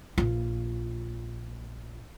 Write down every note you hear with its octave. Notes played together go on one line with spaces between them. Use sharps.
A#1 F4